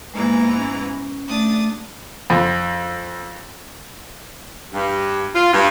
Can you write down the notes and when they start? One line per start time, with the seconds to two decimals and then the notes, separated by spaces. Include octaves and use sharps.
0.14 G#2 E3 G#3 A#3 B3 A#5
0.57 C#4
1.28 A3 D4 D#6 A6
2.30 F2
4.74 G2
5.34 F4
5.52 G2